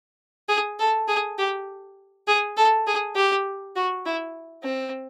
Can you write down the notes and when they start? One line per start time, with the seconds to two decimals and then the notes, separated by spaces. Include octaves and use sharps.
0.49 G#4
0.79 A4
1.08 G#4
1.38 G4
2.27 G#4
2.57 A4
2.87 G#4
3.15 G4
3.76 F#4
4.05 E4
4.63 C4